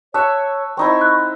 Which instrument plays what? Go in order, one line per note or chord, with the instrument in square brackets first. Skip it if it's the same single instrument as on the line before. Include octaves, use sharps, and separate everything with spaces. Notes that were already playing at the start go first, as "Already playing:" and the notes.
[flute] C#5 [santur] E5 C#6 [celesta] A5 F#6
[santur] C4 D#4 E4 [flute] C#6
[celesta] F#6